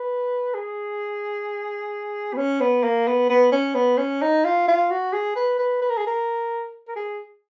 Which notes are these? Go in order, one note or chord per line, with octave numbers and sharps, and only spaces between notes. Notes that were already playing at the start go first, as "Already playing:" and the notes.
Already playing: B4
G#4
B3
C#4
B3
A#3
B3
B3
C#4
B3
C#4
D#4
F4
F4
F#4
G#4
B4
B4
B4
A#4
G#4
A#4
A#4
G#4